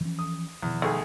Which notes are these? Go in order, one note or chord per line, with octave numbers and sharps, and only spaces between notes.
E3 F3 C#4
D#6
E2 B2 D#3 F3
B1 A3 G#4